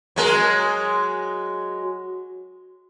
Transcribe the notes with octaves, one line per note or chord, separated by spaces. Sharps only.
F#3 G#3 A#4